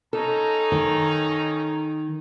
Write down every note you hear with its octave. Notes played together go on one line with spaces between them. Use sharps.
C#4 D#4 A4 A#5
D#3